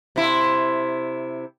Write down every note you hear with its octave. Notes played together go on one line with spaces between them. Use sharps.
C3 E4